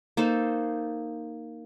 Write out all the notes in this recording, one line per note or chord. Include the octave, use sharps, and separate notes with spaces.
A#3 D#4 A4 C5